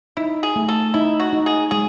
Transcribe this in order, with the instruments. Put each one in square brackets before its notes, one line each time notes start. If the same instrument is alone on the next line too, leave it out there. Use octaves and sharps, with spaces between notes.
[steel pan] D#4 [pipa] E4
[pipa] G#4
[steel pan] A3
[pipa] A4
[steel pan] D#4 [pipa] E4
[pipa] F#4
[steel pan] D#4
[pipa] G#4
[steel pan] G#3 [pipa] G#4